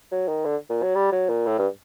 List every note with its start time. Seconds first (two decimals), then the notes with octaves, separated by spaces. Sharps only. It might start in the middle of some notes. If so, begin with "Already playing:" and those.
0.11 F#3
0.28 D#3
0.45 D3
0.69 A#2
0.83 F#3
0.95 G3
1.12 F#3
1.29 A#2
1.46 A2
1.58 G2